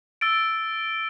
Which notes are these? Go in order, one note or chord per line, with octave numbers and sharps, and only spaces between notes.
E6 A6 D7